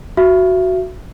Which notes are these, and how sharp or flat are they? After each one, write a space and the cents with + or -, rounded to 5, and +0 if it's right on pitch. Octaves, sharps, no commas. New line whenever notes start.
F#4 +0 E5 +30